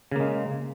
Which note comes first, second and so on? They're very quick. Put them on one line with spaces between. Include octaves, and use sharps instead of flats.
C#3 A#3 G#3